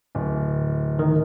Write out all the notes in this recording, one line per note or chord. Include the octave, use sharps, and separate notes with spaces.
D1
D#3